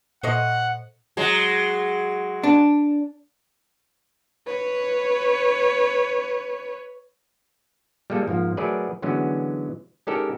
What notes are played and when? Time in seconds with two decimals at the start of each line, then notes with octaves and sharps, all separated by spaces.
0.23 A#2 A4 C5 C#5 D#5 E5 F#5
1.17 F#3 G#3
2.44 D4
4.47 B4 C#5
8.10 G3 G#3 A#3 A4
8.28 G#2 F3 A#3
8.57 F#3 A3 G#4 A#4 B4 D5
9.02 D3 E3 F#3 G#3 B3 C#4
10.07 G#3 C#4 D#4 G4 A4 A#4